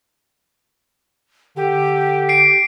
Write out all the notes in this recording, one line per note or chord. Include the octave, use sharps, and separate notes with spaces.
D3 G4
C7 D7